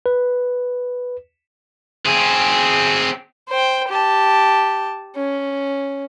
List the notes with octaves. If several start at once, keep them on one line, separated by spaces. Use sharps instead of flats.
B4
C4 G#4
C5 G5
G4 A5
C#4